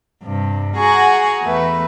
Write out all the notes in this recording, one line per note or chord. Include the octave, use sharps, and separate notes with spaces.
G2 C3
F#4 G#4 F#5 G#5 A#5 C#6
E2 A3 B4